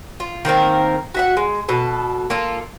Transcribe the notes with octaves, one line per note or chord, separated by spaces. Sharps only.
F4
D#3 A#3 C4 A#4
F#4 E5 F#5
G#3
B2 A4
A#3 F4 A4